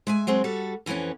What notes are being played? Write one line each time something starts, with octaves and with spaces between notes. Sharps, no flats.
G#3 E5 G#5
F#3 G#3 C4 G#4
G3 F#4 A4
F2 E3 A#3 B3 C#4